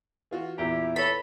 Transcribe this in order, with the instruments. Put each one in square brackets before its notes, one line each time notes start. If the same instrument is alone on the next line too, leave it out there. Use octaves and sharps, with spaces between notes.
[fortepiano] E3 F4 F#4
[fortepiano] E2 A#2 A#5 [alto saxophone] E4 [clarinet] G4
[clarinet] A4 [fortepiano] B4 C#5 [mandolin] B5